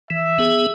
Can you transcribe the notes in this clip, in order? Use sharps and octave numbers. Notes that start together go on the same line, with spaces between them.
E3 E5
B3 G#4